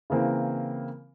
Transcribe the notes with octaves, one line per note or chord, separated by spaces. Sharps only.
C#3 E3 A#3 C4 A#4